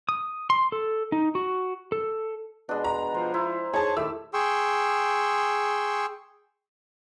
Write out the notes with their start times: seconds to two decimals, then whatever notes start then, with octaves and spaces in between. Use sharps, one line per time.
0.09 D#6
0.50 C6
0.72 A4
1.12 D#4
1.35 F#4
1.92 A4
2.69 B2 G#3 D4
2.84 A#5
3.14 F3 C5
3.34 E4 C5
3.74 D#4 G#4 C#5 A5
3.97 D#3 A3 E4 G4 E6
4.34 G#4 G5 C6 C#6 E6